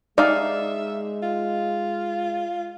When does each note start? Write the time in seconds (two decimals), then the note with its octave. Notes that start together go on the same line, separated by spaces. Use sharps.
0.18 G#3 D#4 D5 E5 F5
1.22 F4